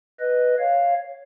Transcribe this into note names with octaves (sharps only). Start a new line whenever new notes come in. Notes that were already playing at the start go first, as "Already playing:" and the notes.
B4 D#5
C#5 F5